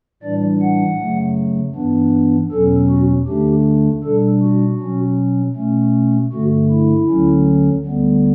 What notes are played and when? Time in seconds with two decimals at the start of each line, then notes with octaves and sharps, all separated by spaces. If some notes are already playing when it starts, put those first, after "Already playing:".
0.22 A2 E3 G3 D4 D5
0.61 F#5
1.00 F#2 C#3 F#3 A3
1.75 G2 E3 B3 D4
2.52 E2 B2 F#3 C#4 A4
2.90 F#4
3.27 D2 D3 A3 D4 G4
4.04 B2 G3 D4 A4
4.42 F#4
4.80 B2 F#3 C#4
5.56 B2 A3 C#4
6.32 G2 D3 A3 F#4
6.70 E4
7.08 D2 D3 F#3 C#4
7.85 D2 D3 G3 B3